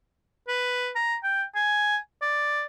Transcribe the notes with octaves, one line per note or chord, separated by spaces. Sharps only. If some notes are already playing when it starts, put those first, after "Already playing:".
B4
A#5
G5
G#5
D5